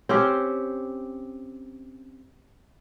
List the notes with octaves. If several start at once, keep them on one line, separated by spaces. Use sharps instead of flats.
C4 C#4 G4 C5